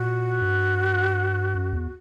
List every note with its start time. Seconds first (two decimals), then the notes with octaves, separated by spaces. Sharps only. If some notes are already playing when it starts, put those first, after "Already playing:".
Already playing: A#2 F#4
0.41 G2
1.54 F#2
1.73 E2